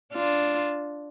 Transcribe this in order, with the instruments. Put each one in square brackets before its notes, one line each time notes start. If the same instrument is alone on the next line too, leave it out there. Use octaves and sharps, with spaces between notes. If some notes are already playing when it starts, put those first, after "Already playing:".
[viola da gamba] D4 F4